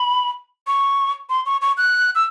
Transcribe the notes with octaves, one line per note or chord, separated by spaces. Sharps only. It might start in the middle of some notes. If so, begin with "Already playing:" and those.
Already playing: B5
C#6
C6
C#6
C#6
F#6
E6